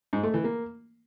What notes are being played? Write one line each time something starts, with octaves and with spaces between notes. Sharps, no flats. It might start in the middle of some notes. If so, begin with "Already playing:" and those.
G#2
A3
E3
A#3